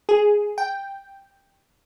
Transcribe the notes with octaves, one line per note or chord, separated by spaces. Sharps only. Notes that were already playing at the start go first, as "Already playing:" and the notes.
G#4
G5